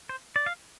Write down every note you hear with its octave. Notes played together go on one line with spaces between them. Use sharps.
C5
D5
F5